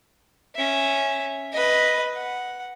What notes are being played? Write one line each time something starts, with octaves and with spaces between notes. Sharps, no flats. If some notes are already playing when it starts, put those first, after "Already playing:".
C#4 E5
B4 D#5
F#5